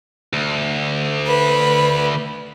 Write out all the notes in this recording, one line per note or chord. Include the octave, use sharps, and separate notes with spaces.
D2
B4